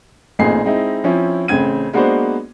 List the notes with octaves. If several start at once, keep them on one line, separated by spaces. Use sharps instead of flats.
A1 A#2 C4 D#4 G#4 C7
G#3 C4 D#4 E4
F3 C4 C#4 E4
A1 C#3 C4 G#6 D#7
G#3 A#3 B3 D4 F#4 C5